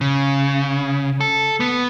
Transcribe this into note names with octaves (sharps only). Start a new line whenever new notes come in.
C#3
A4
B3